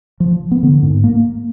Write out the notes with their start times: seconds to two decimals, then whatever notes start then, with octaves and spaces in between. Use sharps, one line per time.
0.20 F3
0.51 B3
0.63 D3
0.83 G#2
1.04 A#3